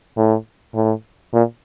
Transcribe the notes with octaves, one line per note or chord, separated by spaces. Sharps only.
A2
A2
A#2